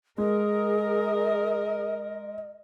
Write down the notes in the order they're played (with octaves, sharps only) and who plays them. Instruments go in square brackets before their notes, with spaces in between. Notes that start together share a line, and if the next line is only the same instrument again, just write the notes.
[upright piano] G#3 [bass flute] G#4 [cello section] A#4 [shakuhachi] D#5